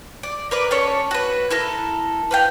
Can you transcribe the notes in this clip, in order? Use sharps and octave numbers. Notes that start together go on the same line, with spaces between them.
D5
A#4 B4 D5
C#4 A4 C#5
F#4 B4
E4 A4 A#4
B4 F5 G5